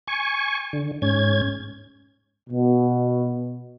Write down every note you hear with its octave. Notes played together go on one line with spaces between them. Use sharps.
G#5 C#6
D3
G#2 C#4 G#6
B2